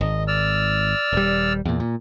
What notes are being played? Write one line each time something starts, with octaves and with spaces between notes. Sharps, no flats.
G#1 D#5
D5 E6 F6
D#1 G3
E2 A#2
A#2